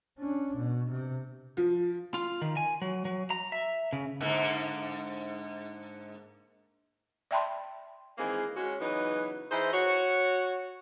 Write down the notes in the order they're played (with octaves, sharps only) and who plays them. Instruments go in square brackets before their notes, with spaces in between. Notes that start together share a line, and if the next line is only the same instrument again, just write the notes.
[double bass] C#4 D4
B2
C3
[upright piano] F3
[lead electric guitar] F4
D#3
G#5
F#3
F#3
A#5
E5
C#3
[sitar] G#2 D3 A#3
[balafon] D5 E5 G5 A5 B5 C6
[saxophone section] D#3 E3 G#3 A#3 C4 G#4
G#3 C#4 F#4
C#3 E3 F#3 B3 D#4 B4
E3 D#4 E4 G#4 C5
F#4 C#5